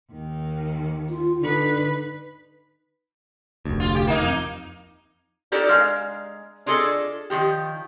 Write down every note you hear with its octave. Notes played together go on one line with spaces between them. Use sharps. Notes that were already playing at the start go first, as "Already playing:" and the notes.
D#2 D#3
F4
D3 D#4 B4
F1 D2
F4
G4
A#3 D#4
F2
D4 D#4 G4 A4 A#4 D5
G#3 F5 A#5
D4 F4 G#4 A4 D#5
D#3 F3 G4